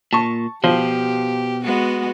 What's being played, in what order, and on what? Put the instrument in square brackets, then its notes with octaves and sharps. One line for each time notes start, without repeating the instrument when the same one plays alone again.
[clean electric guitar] A#2 [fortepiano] A5 C#6
[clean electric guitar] B2 [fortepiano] F3 [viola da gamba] G4
[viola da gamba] G#3 B3 F#4